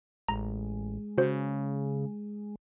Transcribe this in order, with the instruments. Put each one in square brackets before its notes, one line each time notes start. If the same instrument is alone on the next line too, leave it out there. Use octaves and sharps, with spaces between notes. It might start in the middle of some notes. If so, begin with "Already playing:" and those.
[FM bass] A1 [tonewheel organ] G#3 [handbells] A#5
[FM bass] C#3 [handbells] F#4 C5